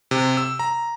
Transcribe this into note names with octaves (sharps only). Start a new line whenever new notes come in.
C3
E6
A#5